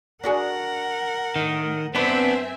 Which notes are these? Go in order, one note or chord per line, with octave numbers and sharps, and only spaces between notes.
D4 F#4 G#4 A#4 F#5
A2 D#3
F#2 B3 C4 D4 B4 C5 E5 G#5